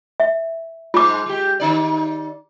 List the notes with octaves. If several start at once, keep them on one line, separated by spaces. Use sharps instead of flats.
E5
G#2 G#3 F4 D6
G#3 G4
D#3 D#4 D5